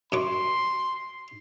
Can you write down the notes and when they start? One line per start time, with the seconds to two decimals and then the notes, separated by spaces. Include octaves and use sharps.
0.12 F#2 C#5 C6 D6